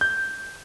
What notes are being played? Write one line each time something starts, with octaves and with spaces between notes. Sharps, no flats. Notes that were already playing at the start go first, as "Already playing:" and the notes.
G6